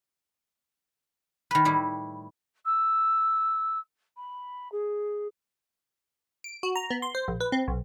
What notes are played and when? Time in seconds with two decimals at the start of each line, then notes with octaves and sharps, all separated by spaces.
1.51 D#3 B4
1.65 A2 G3 E4
2.66 E6
4.17 B5
4.72 G#4
6.44 D7
6.63 F#4
6.76 A#5
6.90 B3
7.02 C6
7.15 C5
7.28 A#1
7.40 B4
7.52 C4
7.68 B1